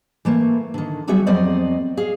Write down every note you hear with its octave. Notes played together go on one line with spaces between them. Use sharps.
E3 A3 A#3
D3 D#3
F#3 G3 B3 F#4 G#4 E5
F2 F#3 B3 C4 D5 D#5
G#4 F5